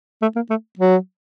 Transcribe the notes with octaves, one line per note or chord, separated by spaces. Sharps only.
A3
A#3
A3
F#3